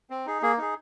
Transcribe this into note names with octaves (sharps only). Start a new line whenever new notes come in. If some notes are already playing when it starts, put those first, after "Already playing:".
C4
D#4 G#4
A#3 G#4
D#4 G#4